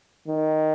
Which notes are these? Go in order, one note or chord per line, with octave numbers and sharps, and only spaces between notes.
D#3